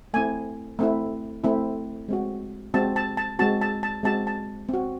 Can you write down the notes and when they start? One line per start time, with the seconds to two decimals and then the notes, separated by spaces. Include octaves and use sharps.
0.14 A3 C4 E4 G#5
0.79 A3 C4 E4
1.44 A3 C4 E4
2.09 G#3 C4 F#4
2.74 G#3 C4 F#4 A5
2.96 A5
3.17 A5
3.39 G#3 C4 F#4 A5
3.61 A5
3.83 A5
4.03 G#3 C4 F#4 A5
4.27 A5
4.69 C4 F#4